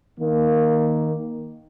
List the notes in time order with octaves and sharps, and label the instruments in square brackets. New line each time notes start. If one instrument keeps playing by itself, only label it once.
[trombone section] D#3 A#3